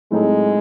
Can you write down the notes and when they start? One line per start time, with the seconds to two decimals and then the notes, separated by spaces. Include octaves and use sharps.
0.12 A2 F#3 G#3 C4 D#4 A4